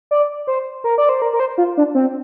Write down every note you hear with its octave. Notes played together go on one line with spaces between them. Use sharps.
D5
C5
A#4
D5
C5
A#4
A#4
C5
F4
D4
C4